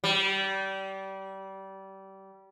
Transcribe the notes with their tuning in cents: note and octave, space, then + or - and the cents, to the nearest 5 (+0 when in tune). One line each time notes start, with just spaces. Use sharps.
G3 -25